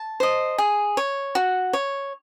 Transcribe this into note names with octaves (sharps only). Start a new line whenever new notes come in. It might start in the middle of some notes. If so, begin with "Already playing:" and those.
Already playing: A5
C5 D#5
G#4
C#5
F#4
C#5